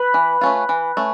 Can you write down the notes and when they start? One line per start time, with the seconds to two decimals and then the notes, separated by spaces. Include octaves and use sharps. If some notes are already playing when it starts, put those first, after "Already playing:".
Already playing: B4
0.14 E3
0.41 A3 C#4 F4
0.69 E3
0.97 A3 C#4